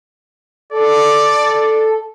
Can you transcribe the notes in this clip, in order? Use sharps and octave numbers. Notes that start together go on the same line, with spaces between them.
A4 D5